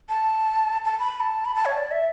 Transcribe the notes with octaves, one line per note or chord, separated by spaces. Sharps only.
A5
A5
B5
B5
A5
B5
A5
C#5
D5
E5